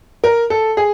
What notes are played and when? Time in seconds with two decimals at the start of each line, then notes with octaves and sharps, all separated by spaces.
0.24 A#4
0.50 A4
0.77 G#4